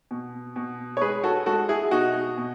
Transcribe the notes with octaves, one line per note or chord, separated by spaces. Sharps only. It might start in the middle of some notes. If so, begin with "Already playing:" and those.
B2
B2
C#5
G#3 G#4 B4
F#4 A4
G#3 F#4 A4
E4 G#4
B2 D#4 F#4
B2